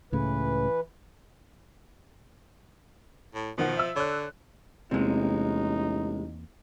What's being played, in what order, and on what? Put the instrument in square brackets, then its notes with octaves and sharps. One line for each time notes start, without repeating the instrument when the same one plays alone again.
[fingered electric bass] C#2 A2 C#3 [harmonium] E3 B4
[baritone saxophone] A2
[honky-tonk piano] B2 D#3 F#5 [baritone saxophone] F3
[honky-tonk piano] E5 E6
[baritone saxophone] D3 [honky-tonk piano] C#5 F#6
[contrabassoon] A1 [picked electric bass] E2 A#3 C4 [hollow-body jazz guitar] C3 G#3 [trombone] D#4